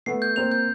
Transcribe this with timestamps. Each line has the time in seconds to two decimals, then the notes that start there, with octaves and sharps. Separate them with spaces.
0.06 A3 B3 C7
0.22 G6
0.36 A#3 C4 F7
0.51 G6